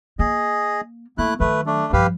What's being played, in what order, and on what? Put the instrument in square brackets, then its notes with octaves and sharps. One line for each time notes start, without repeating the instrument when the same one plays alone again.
[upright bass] A#3 [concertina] G#4 D#5
[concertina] A3 E4 F#6 [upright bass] A#3
[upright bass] D#3 F#3 [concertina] A3 B4
[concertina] A3 D4
[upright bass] G2 F3 [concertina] G4 B4 F5